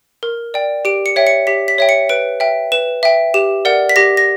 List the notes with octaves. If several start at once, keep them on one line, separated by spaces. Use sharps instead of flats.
A#4
D5 G5
G4 D7
C#7
C#5 E5 G5
C#7
G4 B6
B6
C#5 E5 G5
C#7
B4 D7
E5 G5
B4 E7
E5 G5
G4 E7
A#4 D5 F#5
B6
G4 A#6
A#6